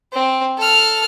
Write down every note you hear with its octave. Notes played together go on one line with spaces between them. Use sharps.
C4
A4 F6